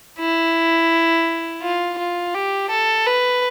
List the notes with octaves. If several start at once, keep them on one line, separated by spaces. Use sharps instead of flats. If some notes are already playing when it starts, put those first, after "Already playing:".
E4
F4
F4
G4
A4
B4